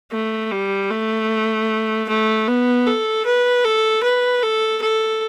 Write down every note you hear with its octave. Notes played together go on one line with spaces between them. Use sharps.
A3
G3
A3
A3
B3
A4
B4
A4
B4
A4
A4